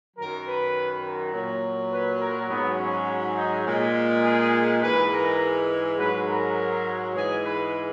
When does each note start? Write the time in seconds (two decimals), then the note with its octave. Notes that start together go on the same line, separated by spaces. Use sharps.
0.17 F#2 D#3 F#3 A#4
0.47 B4
1.04 A#4
1.34 A#2 F#3
1.92 B4
2.21 A#4
2.50 G#2 F#3 B3
2.78 C#4
3.37 D#4
3.67 A#2 G#3
4.24 G#4
4.82 G#2 E3 G#3 B4
5.11 A#4
5.98 G#2 F#3 B4
6.28 A#4
7.14 G#2 E3 G#3 G#4
7.44 B4